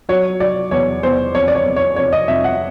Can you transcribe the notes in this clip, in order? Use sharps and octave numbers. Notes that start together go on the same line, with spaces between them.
F#3 C#5
F#3 D5
E2 C#5
E2 C5
F2 C#5
D5
C#5
F2
C#5
F2 C#5
D#5
F2 E5
F#5